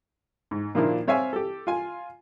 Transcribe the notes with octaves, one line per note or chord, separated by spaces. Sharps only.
G#2
A#2 D#3 F3 A#3 D4 E4
C4 C#5 E5 F5 G#5
G4 A4
F4 G#5